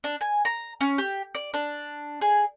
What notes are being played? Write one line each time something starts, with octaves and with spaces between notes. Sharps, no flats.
D4
G#5
A#5
C#4
G4
D5
D4
G#4